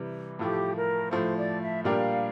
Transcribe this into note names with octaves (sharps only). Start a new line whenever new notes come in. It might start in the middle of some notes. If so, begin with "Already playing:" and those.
Already playing: C3 E3 G3
A2 F3 A3 G4
A#4
A2 F3 A3 C5
D5
E5
A#2 G3 D4 G4 A#4 F5